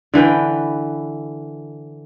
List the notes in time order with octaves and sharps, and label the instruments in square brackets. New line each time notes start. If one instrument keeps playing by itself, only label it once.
[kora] D3 E3 B4 G5